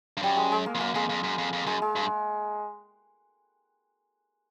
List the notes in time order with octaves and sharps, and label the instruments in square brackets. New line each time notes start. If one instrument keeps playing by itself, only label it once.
[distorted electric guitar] G2
[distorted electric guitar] F#2 [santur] G3
[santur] G#3
G#3
A#3
[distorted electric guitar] F2
[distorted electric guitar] F#2 [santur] A#3
[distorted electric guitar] F2 [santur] G#3
[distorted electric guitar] F2
F#2
F2
F2
[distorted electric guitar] F#2 [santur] G#3
[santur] G#3
[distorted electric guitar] G2